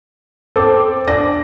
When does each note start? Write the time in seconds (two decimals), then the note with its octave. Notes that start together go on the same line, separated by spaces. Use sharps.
0.56 C4 A4 D6
1.08 D4 A#6